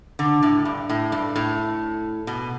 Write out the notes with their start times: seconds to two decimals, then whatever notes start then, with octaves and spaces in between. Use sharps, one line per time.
0.19 D3
0.43 A2
0.65 G2
0.89 A2
1.12 G2
1.36 A2
2.27 B2